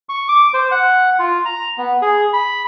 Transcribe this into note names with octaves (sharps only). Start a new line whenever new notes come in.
C#6
D6
C5
F#5
F4
A#5
B3
G#4
B5